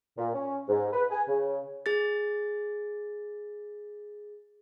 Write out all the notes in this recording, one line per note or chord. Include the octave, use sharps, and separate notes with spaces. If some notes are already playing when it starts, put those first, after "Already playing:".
A#2
C#4
G#2
B4
G#5
C#3
G#4 A6